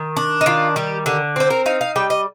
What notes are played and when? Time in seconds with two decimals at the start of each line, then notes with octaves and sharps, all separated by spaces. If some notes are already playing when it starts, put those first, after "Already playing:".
Already playing: D#3
0.17 D4
0.41 D#4
0.46 D#3 F4
0.76 G3 G4
1.06 D3 G4
1.36 C4 C5
1.50 A#4
1.66 D#4 F5
1.81 F5
1.96 G3 G5
2.10 D#5